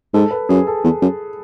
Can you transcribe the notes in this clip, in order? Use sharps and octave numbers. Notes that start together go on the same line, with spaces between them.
G#2 A4
B4
F#2 G#4
A4
E2
F#2